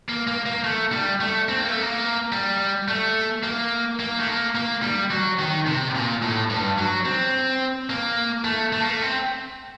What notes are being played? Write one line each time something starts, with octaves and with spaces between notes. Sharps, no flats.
A#3
A#3
A#3
A3
G3
A3
C4
A#3
A3
A#3
G3
A3
A#3
A#3
A3
A#3
A#3
G3
F#3
D#3
C3
A#2
A2
G2
F#3
C4
A#3
A3
A3
A#3
A3
C4